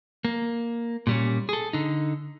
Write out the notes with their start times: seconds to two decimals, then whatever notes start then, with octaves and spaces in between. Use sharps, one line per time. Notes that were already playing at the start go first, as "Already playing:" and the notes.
0.25 A#3
1.07 A#2 G3 C#4
1.49 G#4 A4
1.73 D3 D#4